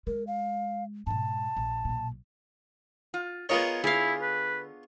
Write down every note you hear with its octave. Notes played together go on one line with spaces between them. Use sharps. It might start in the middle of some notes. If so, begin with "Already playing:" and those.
G#3 A#4
F5
G#2 B2 A5
A#1
B1 A#2
F4
B3 F4 G#4 A#4 C#5 D#5
D3 E4 G#4 F5
B4